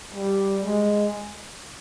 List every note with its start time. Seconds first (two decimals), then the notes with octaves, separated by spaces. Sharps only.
0.15 G3
0.64 G#3